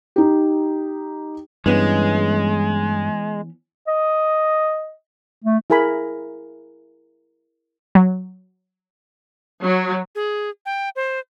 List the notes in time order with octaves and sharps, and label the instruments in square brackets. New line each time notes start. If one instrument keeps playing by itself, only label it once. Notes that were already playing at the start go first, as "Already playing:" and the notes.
[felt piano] D#4 G4
[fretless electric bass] G2 [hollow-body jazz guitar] E3 B3 C#4 [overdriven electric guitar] G#3
[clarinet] D#5
A3
[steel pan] E4 G#4 A#4 G#5 B5
[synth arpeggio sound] F#3
[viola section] F#3
[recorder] G#4
G5
C5